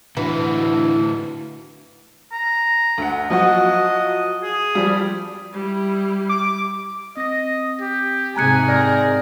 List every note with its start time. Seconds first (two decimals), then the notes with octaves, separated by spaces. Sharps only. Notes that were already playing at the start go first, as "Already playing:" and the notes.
0.17 A2 D3 E3 D4 F#4
2.32 A#5
2.98 D2 F#5
3.30 F3 F#3 F#4 D#5
4.43 G#4
4.75 F3 G3
5.53 G3 E4
6.29 D6
7.17 C4 D#5 A#6
7.81 G4
8.36 G#2 C3 G#4 G#5 A#5 F#6 C#7
8.68 A#4 D5 G6